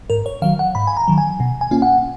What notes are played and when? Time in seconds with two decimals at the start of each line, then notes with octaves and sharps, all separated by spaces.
0.10 G#2 A#4
0.26 C#5
0.42 D#3 F#3 F5
0.59 F#5
0.75 G#2 B5
0.87 G#5
0.97 A#5
1.08 D#3 F#3
1.18 G#5
1.40 B2
1.61 G#5
1.71 A#3 C#4 F4
1.82 F#5